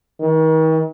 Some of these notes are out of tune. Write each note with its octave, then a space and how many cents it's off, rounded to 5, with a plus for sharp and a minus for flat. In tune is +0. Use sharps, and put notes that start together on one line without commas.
D#3 +40